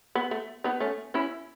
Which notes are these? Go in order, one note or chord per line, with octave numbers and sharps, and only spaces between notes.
B3
A3
B3 D#4
A3 C#4
C#4 E4